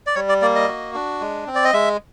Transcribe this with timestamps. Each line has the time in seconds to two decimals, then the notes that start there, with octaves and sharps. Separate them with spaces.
0.06 D5
0.15 G3 C#5
0.29 D5
0.42 A#3 D5
0.55 D#5
0.68 F#4
0.94 D4
1.21 G#3
1.47 C4
1.55 D5
1.64 D#5
1.73 G#3 E5